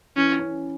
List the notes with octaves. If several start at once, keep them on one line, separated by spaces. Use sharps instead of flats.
E3 C#4
C#4